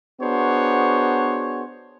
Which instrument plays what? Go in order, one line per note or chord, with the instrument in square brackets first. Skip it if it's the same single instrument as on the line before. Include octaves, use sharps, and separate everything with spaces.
[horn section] B3 D4 F#4 G#4 C5 C#5